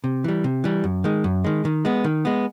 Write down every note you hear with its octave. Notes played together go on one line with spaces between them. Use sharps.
C3
E3 G3
C3
E3 G3
F#2
D#3 G#3
F#2
D#3 G#3
D#3
G#3 B3
D#3
G#3 B3